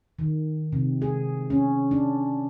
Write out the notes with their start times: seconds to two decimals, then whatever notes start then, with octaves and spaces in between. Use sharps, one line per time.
0.19 D#3
0.72 C3
1.02 G#4
1.50 C#4
1.91 D4